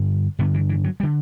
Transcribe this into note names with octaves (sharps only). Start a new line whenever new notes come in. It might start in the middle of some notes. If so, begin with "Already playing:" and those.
Already playing: G2 D3
G2 D3 B3
E3
E3
F#3
G3
D3